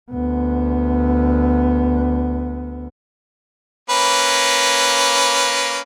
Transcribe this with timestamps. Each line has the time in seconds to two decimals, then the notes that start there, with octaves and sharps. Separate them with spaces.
0.11 D2 B3
3.90 A#3 C#4 B4